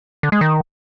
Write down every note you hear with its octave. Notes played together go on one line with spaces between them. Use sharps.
D3
G#3
D#3